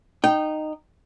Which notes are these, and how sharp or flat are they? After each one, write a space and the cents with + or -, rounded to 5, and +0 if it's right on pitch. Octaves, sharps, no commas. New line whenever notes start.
D#4 -15 G5 -15